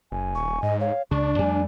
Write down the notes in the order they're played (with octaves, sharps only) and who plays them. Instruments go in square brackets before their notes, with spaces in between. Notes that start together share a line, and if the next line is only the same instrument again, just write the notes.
[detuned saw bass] F#1 [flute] G#5
[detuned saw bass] D#1 [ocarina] C#6
[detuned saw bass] G#2 [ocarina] D#5
[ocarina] C#5 [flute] F5
[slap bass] C#2 C#3 [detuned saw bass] D4 [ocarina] D5 [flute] C#6
[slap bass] F2 G3 A3 [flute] G#5